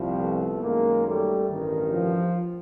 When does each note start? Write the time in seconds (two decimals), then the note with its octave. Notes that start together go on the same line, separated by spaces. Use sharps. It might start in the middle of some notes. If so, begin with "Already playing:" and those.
Already playing: C2 A#2 F3
0.20 A3 B3
0.62 F#2 D#3 G#3 A#3
1.05 G3 A3
1.49 A1 G2 D#3
1.92 F3